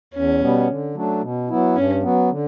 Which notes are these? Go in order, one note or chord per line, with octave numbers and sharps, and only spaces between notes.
E2 C#4
B2 G3 B3
D3
F#3 A3 D4
B2
F#3 B3 E4
G2 C#4
F#3 B3
D3